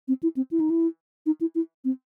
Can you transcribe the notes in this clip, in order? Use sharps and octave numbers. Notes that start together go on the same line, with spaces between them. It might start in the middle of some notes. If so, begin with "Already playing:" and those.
C4
E4
C4
E4
D#4
E4
D#4
E4
E4
C4